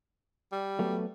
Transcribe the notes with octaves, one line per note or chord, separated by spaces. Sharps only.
G3
F#3 A3 B3